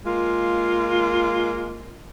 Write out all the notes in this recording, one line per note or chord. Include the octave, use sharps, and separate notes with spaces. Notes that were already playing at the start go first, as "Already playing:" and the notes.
G#3 A#3 F4